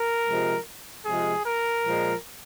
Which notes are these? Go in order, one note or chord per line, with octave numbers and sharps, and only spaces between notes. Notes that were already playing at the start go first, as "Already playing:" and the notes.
Already playing: A#4
C3 F3 G#3
C3 F3 G#3 G#4
A#4
A#2 F3 G#3